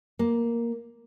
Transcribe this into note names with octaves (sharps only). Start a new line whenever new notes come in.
A#3